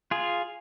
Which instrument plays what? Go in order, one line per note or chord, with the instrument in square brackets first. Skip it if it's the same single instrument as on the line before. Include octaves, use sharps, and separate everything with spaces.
[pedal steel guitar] F4 G#4